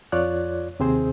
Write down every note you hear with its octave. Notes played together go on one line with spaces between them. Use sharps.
F2 F4 C#5 D5 F#6
D#2 C3 C4 G#4 C5